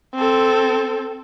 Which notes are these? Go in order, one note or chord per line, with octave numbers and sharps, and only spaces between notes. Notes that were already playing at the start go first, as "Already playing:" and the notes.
C4 A4